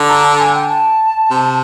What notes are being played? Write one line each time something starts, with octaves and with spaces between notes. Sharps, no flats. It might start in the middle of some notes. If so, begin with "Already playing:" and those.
Already playing: D3
A#5
A5
G#5
G5
A5
C3